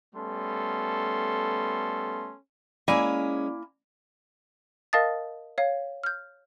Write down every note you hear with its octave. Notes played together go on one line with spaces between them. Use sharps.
G3 A3 B3 C#4 A4 C6
G#3 A#3 C#4 E4 D5 G#5
A#4 D#5 F5 A5 D#6 A6
C#5 F5
F6 G6